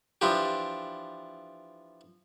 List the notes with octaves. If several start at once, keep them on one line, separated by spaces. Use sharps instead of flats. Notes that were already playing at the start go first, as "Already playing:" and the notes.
E3 F3 D4 G4